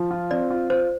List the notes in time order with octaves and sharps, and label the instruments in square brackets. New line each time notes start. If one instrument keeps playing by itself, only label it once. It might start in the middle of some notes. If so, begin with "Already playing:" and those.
Already playing: [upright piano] F3
F4
[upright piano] C4 [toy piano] D5
[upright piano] F4
[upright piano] F4 [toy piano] C5